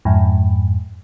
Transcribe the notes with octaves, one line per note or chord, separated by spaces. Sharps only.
F2 G#2